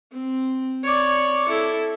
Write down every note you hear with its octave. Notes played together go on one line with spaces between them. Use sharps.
C4
C#5 D5
E4 A4